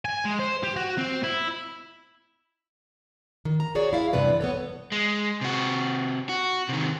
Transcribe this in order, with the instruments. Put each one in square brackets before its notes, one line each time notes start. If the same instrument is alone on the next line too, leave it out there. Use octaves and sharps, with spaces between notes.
[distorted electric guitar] G#5
G#3
C5
G4
F#4
C4
E4
[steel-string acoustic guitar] D#3
A#5
F#4 G#4 C#5 D5
E4 F5
E2 G2 C3 B4 D5
B3 A4 C#5
[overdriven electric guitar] G#3
C3 F#4
F#4
C3 D#3